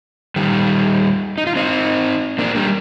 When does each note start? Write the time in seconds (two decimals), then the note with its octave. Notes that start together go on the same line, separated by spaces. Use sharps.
0.36 D#3 G3
1.38 D#4
1.47 F4
1.56 C4 D#4
2.38 A#3 D4
2.55 G3 A#3